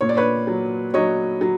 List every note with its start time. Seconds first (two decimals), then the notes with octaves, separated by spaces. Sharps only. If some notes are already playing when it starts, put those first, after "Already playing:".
0.01 A#2 C#5
0.09 D5
0.17 B4 C#5
0.47 F#3
0.94 F#3 C#5 D#5
1.41 F#3